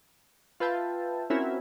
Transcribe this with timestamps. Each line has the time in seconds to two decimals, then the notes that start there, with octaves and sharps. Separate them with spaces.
0.60 F4 B4 E5 G5 A5
1.30 C4 C#4 E4 F#4 A#4